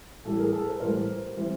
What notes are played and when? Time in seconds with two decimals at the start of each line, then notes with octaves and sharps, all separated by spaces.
0.25 A2 E3 G3 A4
0.39 G#4 A#4
0.53 A4
0.67 A4 B4
0.80 A2 E3 G3 A#4 C5
1.37 E3 G3 C4 E4